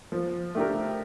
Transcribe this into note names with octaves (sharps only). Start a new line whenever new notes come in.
F3
A3 D4 G4 A#4